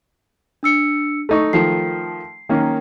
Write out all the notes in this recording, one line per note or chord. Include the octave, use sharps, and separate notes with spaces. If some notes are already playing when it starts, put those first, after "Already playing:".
D4 E6 C#7
A3 D#4 C#6
D#3 F3 A3 C7
D#3 A#3 C#4